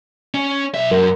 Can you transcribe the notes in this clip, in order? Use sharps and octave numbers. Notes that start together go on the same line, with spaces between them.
C#4
B1 E5
F#2 A#4